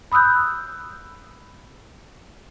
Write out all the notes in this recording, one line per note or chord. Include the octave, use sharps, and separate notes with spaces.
B5 D#6 E6 F#6 G6